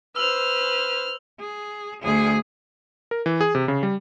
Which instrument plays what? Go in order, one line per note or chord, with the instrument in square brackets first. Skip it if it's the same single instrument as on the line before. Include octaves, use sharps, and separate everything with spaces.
[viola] B4 C5 [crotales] E6 F7 F#7 [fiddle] F6
[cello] G#4
D2 G#4
[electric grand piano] A#4
E3
G#4
C3
C#3
G3